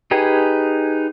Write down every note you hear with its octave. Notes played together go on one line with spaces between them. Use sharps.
D#4 G4 G#4 B4 G#5